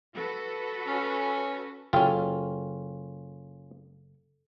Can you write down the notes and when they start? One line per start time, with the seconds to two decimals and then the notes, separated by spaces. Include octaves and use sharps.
0.15 F#4 A4 B4
0.87 C#4
1.93 F#1 C#4 F4 A4 G5